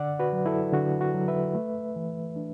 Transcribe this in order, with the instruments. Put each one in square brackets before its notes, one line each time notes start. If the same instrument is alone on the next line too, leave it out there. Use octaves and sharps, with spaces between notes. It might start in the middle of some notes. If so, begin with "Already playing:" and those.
Already playing: [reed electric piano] D3 D5 F#5
F#4 B4
F#3
E4 A4
D3 F#4
F#4
F#3
B4 E5
A3
E3
D4